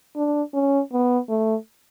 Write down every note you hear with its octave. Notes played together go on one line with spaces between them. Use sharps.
D4
C#4
B3
A3